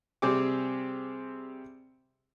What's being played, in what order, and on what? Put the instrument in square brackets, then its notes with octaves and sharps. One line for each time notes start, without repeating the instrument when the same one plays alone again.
[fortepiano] C3 G3 C4 G4 G#4 D6